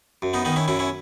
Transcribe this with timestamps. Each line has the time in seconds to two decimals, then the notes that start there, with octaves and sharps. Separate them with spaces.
0.22 F#2
0.33 B3 D#4
0.45 D#3 B3 D#4
0.56 C#4 E4
0.68 F#2 C#4 E4
0.79 C#4 E4